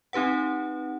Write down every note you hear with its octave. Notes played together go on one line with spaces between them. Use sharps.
C4 D#4 G4 B4 F#5